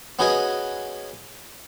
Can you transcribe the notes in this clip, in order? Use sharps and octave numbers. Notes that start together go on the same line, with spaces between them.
B3 C#4 F#4 G#4 B4 D#5